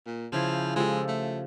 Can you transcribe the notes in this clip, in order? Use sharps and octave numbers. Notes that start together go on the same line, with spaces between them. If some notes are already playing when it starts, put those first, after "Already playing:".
A#2
C#3 F3 E4 C5
F3 G#3 G4 A4
A3